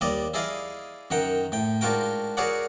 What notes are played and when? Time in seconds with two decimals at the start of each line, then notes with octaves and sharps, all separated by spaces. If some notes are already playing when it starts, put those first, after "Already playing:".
0.01 D#2 G3 D5 D#5 D#6
0.34 E4 G#4 D5 D#5 F5
1.10 F#2 D#3 F#5 G5 A#5
1.52 A2 G5
1.81 G#2 D4 F4 F#4 A#4 G5
2.37 F#4 G#4 A#4 C#5 D5 F#5